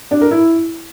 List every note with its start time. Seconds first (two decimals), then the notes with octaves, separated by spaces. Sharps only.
0.11 D4
0.21 A#4
0.31 E4